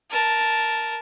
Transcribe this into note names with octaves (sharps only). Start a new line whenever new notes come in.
A#4 A5